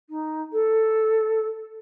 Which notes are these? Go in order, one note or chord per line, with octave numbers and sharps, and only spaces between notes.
D#4
A4